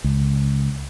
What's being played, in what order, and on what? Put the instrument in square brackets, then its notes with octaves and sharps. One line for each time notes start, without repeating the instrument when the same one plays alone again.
[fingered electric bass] C#2